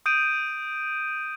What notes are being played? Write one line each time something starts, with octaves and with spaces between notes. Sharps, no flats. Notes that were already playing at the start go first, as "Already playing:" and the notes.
D#6 G6 D7 D#7